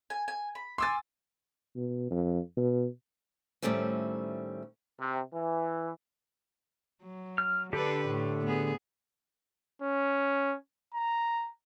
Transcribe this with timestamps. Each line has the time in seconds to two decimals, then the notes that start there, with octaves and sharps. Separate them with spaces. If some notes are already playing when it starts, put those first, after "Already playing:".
0.10 G#5
0.28 G#5
0.55 B5
0.78 G#5 C6 D6 E6 F6 A6
1.76 B2
2.11 F2
2.57 B2
3.62 A2 D#3 G3 A3 C4 C#4
5.00 C3
5.34 E3
7.02 F#3
7.38 F6
7.73 D3 D4 G4 A4 B4
8.05 A2 A3
8.45 B3 G#4
9.82 C#4
10.94 A#5